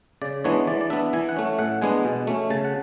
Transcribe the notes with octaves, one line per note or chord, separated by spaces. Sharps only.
C#3 D5
E3 G#3 B3 D4 C#5
E3 D5
D5
B3 D4 E5
E3 G#5
F#5
A3 C#4
A2 F#5
G#3 B3 D4 G#5
B2
A3 C#4
C#3 A5
F#5